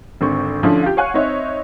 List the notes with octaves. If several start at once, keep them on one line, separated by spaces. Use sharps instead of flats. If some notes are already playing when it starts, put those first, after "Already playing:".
G#1 D3 C4 C#6
D3 F3 A3 C#4 D4 E4
F4 G4
C#5 F5 F#5 G#5 C#6 F#6
C4 D#4 C#5 E5